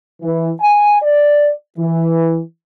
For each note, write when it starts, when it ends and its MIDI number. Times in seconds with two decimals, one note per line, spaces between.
0.22 0.50 52
0.61 1.02 80
1.02 1.51 74
1.78 2.40 52